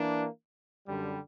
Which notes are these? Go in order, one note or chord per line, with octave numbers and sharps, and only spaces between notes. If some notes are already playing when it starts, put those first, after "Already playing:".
Already playing: E3 A#3 D4
F#2 D3 G3